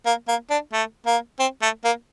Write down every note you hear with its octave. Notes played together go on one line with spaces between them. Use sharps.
A#3
A#3
D4
A3
A#3
C4
A3
A#3